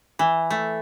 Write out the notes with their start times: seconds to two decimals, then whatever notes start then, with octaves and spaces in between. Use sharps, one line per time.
0.19 E3
0.50 A3